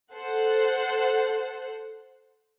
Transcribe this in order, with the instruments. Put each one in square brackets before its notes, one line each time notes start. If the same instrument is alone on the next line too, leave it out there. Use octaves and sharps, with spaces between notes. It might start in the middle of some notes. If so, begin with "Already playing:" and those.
[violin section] A4 C5 F#5